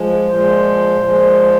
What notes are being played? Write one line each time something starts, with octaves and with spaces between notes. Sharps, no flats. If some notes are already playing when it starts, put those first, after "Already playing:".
Already playing: F3 G#3
A#2 F3 G#3 C5
A#2 F3 G#3